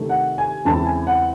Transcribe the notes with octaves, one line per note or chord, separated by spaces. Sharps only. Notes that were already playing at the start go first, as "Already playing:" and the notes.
Already playing: C3 D#3 A3
F#5
G#5
E2 C#3 G#3 C4 E4 A5
G#5
F#5